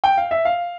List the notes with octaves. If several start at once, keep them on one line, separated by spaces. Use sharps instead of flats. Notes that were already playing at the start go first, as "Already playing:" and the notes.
G5
F5
E5
F5